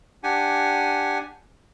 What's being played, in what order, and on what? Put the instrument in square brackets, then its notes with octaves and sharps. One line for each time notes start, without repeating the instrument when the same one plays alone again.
[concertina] D4 G4 F#5 G#5